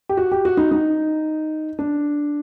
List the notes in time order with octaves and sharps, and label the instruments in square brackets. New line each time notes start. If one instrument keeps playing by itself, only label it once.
[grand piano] G4
F#4
G4
F#4
D#4
D#4
D4